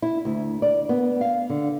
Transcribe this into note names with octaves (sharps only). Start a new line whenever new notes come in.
E4
D2
D5
B3
F5
D3